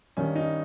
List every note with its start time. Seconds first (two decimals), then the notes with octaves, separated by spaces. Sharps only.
0.17 G2 D#3 C#4
0.35 D#4